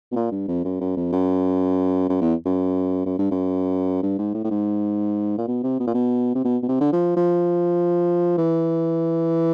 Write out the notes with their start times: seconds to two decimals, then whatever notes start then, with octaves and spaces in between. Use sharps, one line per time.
0.12 B2
0.16 A#2
0.32 G2
0.48 F2
0.65 F#2
0.81 F#2
0.97 F2
1.12 F#2
2.10 F#2
2.22 E2
2.46 F#2
3.06 F#2
3.19 G2
3.31 F#2
4.03 G2
4.19 G#2
4.34 A2
4.44 A2
4.51 G#2
5.38 A#2
5.48 B2
5.64 C3
5.80 B2
5.87 A#2
5.94 B2
6.35 C3
6.45 B2
6.63 B2
6.69 C3
6.81 D3
6.93 F3
7.17 F3
8.38 E3